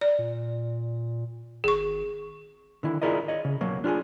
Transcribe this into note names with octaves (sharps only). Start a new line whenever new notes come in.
D5
A#2
G#1 G#4 C#6
D3 D#3 E4
E4 F4 G#4 A#4 D5 D#5
C#5 D#5
C#3
B1 F#3 A#3
D4 F4 G4 G#4